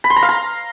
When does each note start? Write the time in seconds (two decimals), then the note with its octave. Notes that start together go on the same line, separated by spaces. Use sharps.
0.04 B5
0.10 C6
0.16 A#5
0.23 F5
0.29 A#5